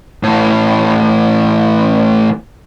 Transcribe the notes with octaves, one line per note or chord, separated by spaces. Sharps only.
A2 E3